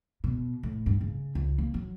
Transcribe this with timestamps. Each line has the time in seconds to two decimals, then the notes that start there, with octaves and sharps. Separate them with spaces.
0.24 B2
0.63 A2
0.86 G2
1.01 C#3
1.35 C#2
1.58 A#3
1.74 F#3